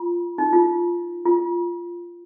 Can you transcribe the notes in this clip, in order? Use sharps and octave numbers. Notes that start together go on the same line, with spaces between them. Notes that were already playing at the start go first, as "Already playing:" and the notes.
Already playing: F4
D#4
F4
F4